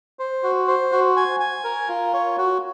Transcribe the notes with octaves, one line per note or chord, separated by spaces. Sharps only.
C5
F#4
C5
F#4
G#5
G#5
A#4
F4
C#5
F#4